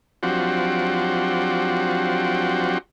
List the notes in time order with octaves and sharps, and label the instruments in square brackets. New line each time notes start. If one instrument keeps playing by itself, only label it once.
[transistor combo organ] F3 F#3 C4 D4 F#4 G4